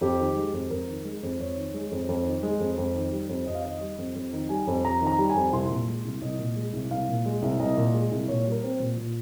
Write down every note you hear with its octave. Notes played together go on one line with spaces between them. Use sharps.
F2 G4
D#3
G#3
F2
F2 A#4
D#3
G#3
F2
F2 C#5
D#3
G#3
F2
F2
D#3
G#3
F2
F2
D#3
G3
F2
F2 D#5
F5
D#3 D#5
G3
F2
F2
D#3
G3 G#5
F2
F2 A#5
D#3
A#5
G3
G#5
F2
C2 C6
A#2
G#3
C2
C2 D#5
A#2
G#3
C2
C2 F5
A#2
G#3
C2
C2 D#5
A#2
G#3
C2
A#2 C#5
G3
A#4
C4
A#2
A#2 F4